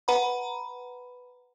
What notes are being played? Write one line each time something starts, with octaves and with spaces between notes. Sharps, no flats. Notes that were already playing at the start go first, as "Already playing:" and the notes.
B4 F#5 A#5 B5